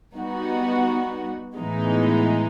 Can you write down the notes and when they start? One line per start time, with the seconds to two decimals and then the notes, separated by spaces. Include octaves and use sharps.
0.14 G3 B3 D#4 F#4
1.57 A2 E3 G#3 B3 D#4